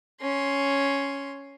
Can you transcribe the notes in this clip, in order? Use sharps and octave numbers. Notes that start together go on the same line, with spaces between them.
C#4 C6